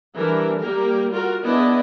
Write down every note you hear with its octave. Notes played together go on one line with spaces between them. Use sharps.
E3 G3 D4 A#4
G3 A#3 G4 A#4
F4 F#4 A#4
B3 D4 E4 G#4 D5 D#5